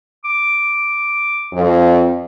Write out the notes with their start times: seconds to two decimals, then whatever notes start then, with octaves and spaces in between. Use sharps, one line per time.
0.24 D6
1.53 F2